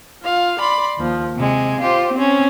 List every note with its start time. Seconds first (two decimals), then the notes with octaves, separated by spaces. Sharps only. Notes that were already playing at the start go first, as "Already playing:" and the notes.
0.23 F4 F5
0.60 D5 B5 C6
0.97 D#2 F3
1.37 C3 G#3
1.80 F4 G4 C5
2.14 C4 C#4